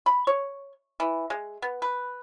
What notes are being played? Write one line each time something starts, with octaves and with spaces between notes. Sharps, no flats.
B5
C#5
E3
G#3
B3
B4